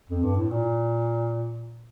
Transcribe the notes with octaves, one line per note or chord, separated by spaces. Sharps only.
F2
G2
A2
A#2